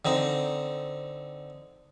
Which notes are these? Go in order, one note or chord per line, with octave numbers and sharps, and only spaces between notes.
D3 C4 D#4